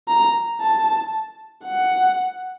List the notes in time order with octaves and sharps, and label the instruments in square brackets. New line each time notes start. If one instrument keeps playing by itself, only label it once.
[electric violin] A#5
A5
F#5